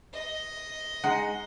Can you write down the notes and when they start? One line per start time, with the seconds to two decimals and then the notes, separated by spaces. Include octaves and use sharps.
0.13 D#5
1.04 G#3 D#4 F#5